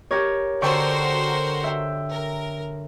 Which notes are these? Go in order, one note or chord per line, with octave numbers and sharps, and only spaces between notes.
G4 A#4 C#5
D3 F#4 A#4 C5 G5 C#6
E5 G5
A#4